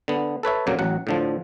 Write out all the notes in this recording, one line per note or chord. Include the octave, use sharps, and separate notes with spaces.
D3 B3
A4 B4 C#5 E5
F2 A#2 C#3 F#3 A#3
A1 F#3 F#5
A2 D3 F3